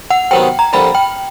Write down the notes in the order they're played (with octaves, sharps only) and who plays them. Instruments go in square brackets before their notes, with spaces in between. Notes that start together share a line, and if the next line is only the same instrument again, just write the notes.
[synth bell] F#5
[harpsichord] C3 D#3 F#3 B3 [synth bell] G5
[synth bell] A#5
[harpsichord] F2 D3 G3 A#3 [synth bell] B5
[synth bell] G5